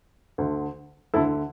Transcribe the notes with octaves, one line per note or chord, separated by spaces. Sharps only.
D2 D3
D2 D3 E4 A4